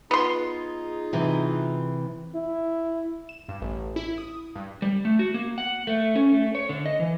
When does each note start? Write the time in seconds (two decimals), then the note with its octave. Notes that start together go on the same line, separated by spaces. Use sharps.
0.11 B3 D#4 F4 G#4 C6
1.13 C3 E3
2.35 E4
3.29 E7
3.48 G2
3.61 A1
3.96 E4
4.18 D#6
4.55 G2
4.82 G3
5.05 A3
5.19 F#4
5.34 A#3
5.58 F#5
5.87 A3
6.15 C#4
6.32 A3
6.55 C#5
6.69 D3
6.86 D#5
7.00 E3